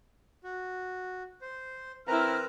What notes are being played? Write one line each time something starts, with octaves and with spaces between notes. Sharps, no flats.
F#4
C5
E3 C4 E4 A#4 B4 A#5 F6